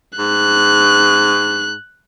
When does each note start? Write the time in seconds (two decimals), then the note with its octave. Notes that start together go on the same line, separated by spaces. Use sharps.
0.19 G#2 F#6